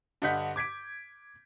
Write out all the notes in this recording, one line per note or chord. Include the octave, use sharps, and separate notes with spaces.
G2 D3 D#5 F#5 G6 B6
D6 G#6 B6 D7